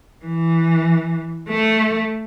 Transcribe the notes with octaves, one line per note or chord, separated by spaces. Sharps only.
E3
A3